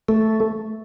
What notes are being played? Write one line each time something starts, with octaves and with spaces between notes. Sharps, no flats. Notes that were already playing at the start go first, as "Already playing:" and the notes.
A3